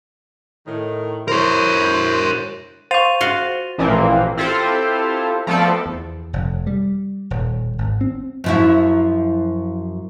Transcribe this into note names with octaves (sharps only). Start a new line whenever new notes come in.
A2 D#3
E4 A#4 C5 C#5
C5 F5 C#6 A6 D#7 F7
F4 F#4
A1 A#2 E3 F3 A#3 C4
C4 E4 F4 G4 A4 C5
F3 A3 B3 C4 A4 D5
E2
F1
G3
D#1
G#1
C4
F#2 F3 E4